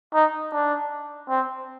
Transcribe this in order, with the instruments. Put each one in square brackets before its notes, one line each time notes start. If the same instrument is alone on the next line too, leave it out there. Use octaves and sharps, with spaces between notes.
[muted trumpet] D#4
D4
C4